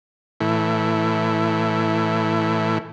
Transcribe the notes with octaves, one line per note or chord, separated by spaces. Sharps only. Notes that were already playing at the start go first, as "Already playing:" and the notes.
A2 E3